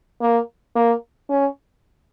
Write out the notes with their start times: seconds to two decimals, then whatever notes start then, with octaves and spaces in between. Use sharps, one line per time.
0.21 A#3
0.76 A#3
1.30 C#4